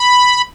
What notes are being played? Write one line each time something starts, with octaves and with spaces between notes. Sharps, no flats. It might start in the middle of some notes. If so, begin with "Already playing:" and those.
Already playing: B5